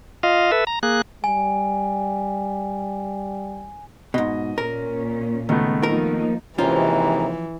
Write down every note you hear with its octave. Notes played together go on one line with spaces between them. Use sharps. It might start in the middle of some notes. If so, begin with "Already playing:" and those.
F4 D#5 F5
A4 B4 E5
A#5
A#3 G#4 F#6
G3 G#5
G#2 B2 D#5
A#2 C#4 A#4
C#2 D#3 A3 B3
F3 A#3 D#4 A#4
D#2 G#2 C3 E3 F3 C#4 F4 A#5